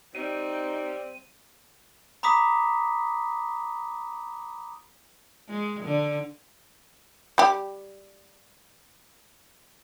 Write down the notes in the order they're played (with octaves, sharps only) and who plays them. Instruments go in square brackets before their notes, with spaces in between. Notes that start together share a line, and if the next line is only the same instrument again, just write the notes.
[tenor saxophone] G3 [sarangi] C4 [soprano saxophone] D#4 [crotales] D#7
[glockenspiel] A#5 B5 D6 D#6 B6
[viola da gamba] G#3
D3
[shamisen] G3 G4